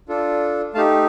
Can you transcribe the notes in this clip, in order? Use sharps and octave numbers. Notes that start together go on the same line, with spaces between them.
D4 F4 A4
A3 D#4 G4 F5 A5